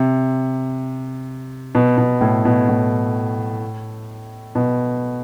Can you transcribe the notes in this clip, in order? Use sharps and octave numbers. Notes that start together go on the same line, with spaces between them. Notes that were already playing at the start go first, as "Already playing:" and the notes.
Already playing: C3
B2
B2
A2
B2
A2
B2